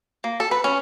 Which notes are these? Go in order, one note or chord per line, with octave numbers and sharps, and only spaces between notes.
A#3
A4
B4
C#4